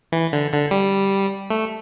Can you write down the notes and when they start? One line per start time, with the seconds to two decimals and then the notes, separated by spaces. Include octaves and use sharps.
0.12 E3
0.33 D3
0.53 D3
0.71 G3
1.50 A3